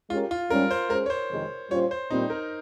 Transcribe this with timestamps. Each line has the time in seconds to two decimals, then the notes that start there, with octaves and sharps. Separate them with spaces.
0.10 G#3 C#4 F4 G4 A#4
0.31 F4
0.50 G#2 G3 C#4 A#4
0.71 C5
0.90 G#3 C#4 G#4 A#4 C5
1.06 C#5
1.10 C5
1.31 F2 C3 D#3 G#3
1.70 A#2 G3 C#4 F4 C5 C#5
1.91 C5
2.10 A#2 G3 C4 D#4
2.30 A#4